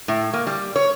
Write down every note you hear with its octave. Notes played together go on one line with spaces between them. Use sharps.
A2
A#3
G3
C#5